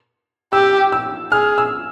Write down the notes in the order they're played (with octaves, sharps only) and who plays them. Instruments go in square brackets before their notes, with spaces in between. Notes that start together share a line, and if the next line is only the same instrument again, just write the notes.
[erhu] G4 [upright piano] E6
[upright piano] E6
[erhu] G#4 [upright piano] F6
[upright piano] E6